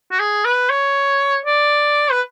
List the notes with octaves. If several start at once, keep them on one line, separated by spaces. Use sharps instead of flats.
F#4
G#4
B4
C#5
D5
B4